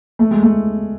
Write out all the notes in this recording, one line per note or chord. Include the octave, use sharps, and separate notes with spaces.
A3
G#3
A3